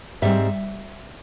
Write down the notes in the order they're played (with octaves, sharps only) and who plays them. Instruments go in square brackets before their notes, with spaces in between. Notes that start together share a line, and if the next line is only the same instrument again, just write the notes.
[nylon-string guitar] G#2 G3 C4 E5